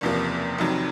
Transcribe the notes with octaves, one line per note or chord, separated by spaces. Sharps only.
F#1 E2 C3 F3 A#3
F1 F2 C3 D#3 F#3